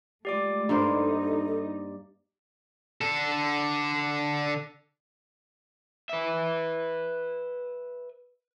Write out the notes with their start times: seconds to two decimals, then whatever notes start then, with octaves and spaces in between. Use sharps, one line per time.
0.25 G#3 A3 F4 G4 D5 D6
0.69 G2 A#3 D#4 A4 C5
3.01 D3 A4
6.09 B4 E5